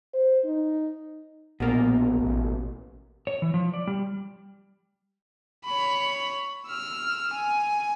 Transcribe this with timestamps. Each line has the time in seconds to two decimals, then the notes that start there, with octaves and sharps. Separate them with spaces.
0.14 C5
0.45 D#4
1.60 A#1 B2 A#3
2.21 A1
3.27 C#5
3.42 E3
3.54 F3
3.74 D5
3.87 G3
5.65 C#5 B5
6.67 E6 F6
7.33 G#5